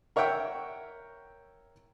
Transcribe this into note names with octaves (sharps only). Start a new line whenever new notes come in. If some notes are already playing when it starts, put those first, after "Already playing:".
A#4 C#5 E5 F#5 G5